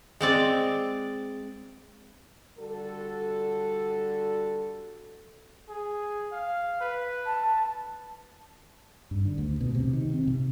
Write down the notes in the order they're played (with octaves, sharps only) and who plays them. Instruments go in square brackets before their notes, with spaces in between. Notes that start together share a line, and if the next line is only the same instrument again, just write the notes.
[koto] G#3 C4 D5
[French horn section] D3 G3 F#4 A4
[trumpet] G#4
F5
B4
[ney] A5
[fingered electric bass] G2
D3
D2
B2
C3
D#3
C4
C3